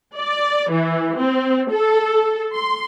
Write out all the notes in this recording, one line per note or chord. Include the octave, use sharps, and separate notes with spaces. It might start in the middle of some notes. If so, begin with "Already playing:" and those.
D5
E3
C4
A4
C6